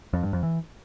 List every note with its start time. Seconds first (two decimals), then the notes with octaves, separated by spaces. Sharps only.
0.13 F2
0.23 G2
0.33 F2
0.43 E3